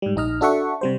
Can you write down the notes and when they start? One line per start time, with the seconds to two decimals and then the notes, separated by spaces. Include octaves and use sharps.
0.02 G#2 G3
0.16 A#1 D#4 D#5 F6
0.41 D4 F#4 A4 E5 F#5 C#6
0.81 C3 G3 C5